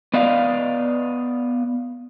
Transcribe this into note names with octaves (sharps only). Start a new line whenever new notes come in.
B3 D5 D#5 F5